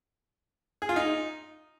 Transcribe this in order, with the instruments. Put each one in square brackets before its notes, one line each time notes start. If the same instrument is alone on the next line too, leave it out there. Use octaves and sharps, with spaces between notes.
[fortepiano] G#4
F4
D#4